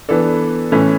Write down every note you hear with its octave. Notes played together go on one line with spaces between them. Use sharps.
E3 B3 D4 A4
A2 E3 A3 C#4